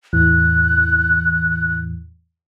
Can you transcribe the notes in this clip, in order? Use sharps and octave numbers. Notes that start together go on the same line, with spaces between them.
E2 A2 E3 F#6